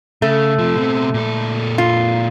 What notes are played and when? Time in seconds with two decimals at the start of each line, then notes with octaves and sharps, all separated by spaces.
0.22 C#3 A3
0.59 C3 F3
0.76 B2 C4
1.14 A#2 A4
1.78 F4